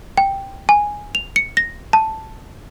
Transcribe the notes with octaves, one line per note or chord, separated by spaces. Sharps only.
G5
G#5
F7
C#7
A#6
A5